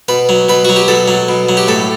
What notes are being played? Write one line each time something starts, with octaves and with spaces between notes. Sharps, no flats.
B2 B4
F#3
B2 B4
F#3 F#4
G4
B2 A4
F#3
B2
F#3
G4
A2 A4